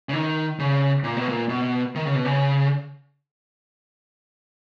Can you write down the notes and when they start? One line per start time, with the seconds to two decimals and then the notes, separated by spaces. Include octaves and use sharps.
0.09 C#3
0.13 D#3
0.59 C#3
1.04 A#2
1.17 B2
1.29 A#2
1.49 B2
1.95 D#3
2.06 C#3
2.15 B2
2.25 C#3